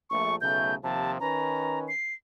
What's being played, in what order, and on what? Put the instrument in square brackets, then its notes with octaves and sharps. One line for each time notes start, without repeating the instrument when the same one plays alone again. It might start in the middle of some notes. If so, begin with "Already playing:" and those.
[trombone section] A#1 A3 [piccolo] C#6
[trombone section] B1 C#3 A3 [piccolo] G6
[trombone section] D#2 C3 F3 [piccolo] A5
[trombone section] D#3 C#4 B4 [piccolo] A#5
[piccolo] C7